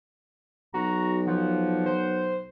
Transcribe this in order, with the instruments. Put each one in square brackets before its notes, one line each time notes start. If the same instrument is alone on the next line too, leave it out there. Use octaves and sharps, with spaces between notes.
[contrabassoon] B1 [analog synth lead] F#4 [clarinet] A#5
[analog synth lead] F3 [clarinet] F#5
[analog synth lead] C5